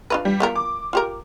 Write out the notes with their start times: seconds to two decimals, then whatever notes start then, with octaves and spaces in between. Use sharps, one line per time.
0.10 D4 F4 B4
0.25 G3
0.40 B3 F4 A#4
0.55 D6
0.93 F4 G4 A#4